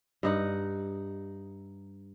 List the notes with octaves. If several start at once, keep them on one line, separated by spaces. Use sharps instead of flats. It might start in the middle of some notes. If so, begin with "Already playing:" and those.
G2 D#4 F#5